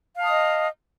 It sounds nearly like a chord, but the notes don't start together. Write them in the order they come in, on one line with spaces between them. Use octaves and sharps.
F5 A5 D#6 D#5